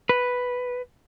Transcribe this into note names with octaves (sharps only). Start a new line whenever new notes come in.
B4